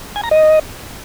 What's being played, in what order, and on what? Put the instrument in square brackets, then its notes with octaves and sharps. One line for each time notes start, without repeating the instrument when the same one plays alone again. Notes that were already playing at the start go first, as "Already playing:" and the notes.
[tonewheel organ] G#5
A#5
D#5